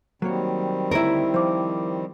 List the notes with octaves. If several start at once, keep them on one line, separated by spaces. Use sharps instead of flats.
D#3 F#3 G3 A#3 C4 C#5
D2 E4 A#4 C#5
F3 C5 D6